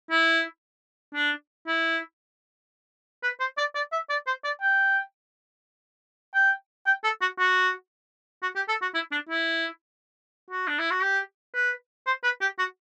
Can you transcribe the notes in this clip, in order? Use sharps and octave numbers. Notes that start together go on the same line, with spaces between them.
E4
D4
E4
B4
C5
D5
D5
E5
D5
C5
D5
G5
G5
G5
A4
F#4
F#4
F#4
G4
A4
F#4
E4
D4
E4
F#4
D4
E4
F#4
G4
B4
C5
B4
G4
F#4